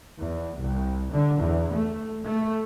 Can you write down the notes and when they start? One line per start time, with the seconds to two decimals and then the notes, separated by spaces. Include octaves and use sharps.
0.19 E2
0.60 C2
1.13 D3
1.41 E2
1.74 A3
2.26 A3